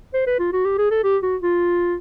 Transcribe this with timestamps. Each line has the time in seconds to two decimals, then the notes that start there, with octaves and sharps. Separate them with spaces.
0.14 C5
0.27 B4
0.39 F4
0.53 F#4
0.65 G4
0.78 G#4
0.91 A4
1.04 G4
1.23 F#4
1.42 F4